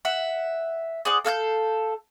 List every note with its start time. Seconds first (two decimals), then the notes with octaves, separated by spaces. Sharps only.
0.05 E5 F#5
1.05 G#4 C5 D5 F#5
1.25 A4 F5 F6 G6